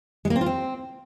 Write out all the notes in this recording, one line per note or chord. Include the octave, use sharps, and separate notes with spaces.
G#3
A#3
C4
F4
C4